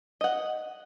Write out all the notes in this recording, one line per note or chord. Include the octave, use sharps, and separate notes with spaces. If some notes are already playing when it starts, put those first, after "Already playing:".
D#5 F#5